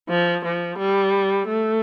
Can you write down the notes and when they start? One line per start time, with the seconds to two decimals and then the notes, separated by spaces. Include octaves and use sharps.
0.09 F3
0.45 F3
0.78 G3
1.48 A3